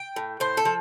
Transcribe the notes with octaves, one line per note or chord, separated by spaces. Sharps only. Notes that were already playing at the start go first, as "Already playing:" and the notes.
Already playing: G5
A2
A2 C5
A4
F3